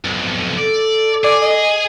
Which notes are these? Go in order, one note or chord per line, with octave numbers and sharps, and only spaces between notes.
B1 F2
A4 D5
G#4 D5
D#5